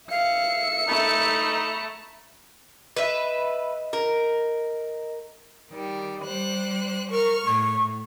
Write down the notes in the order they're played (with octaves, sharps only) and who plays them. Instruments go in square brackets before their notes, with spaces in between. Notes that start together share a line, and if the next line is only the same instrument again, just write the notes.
[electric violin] E5 C#7 [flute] F5
[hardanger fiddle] A3 A#5 [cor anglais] D#4 [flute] B5
[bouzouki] B4 E5 [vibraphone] D#5
[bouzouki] A#4
[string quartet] D#3 G3
G3 C5 F#6
[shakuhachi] A#4 [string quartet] C#6 F6
[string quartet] A2 [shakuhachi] C#6